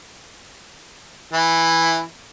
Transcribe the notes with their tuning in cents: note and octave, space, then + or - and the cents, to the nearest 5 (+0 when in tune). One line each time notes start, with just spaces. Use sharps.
E3 +0 E4 +0